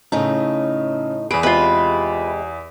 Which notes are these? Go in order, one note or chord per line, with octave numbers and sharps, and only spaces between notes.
A2 C#3 A3 D#4
E2 G#4 B4 D7
C3 G#3 F4 B4